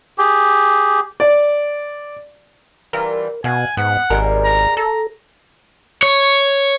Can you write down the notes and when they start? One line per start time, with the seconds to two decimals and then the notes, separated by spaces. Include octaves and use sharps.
0.18 G4 G#4
1.20 D5
2.93 E3 G3 F4 A#4
3.44 B2 F5 F#5 G#5
3.77 G#2 B3 F#5
4.10 G#1 G3 G#3 A#4
4.45 A#5
4.77 A4 A#5
6.03 C#5